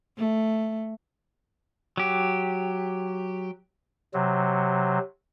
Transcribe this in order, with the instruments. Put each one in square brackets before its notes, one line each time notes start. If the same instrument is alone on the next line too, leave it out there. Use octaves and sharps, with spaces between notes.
[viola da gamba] A3
[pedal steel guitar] F#3 G4
[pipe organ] C3 F#3